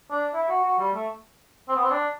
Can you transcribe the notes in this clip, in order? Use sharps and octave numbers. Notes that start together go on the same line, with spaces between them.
D4
E4
F#4
F#4
G3
A3
C4
B3
C4
D4